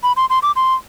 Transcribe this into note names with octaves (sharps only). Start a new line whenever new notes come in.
B5
C6
C6
D6
C6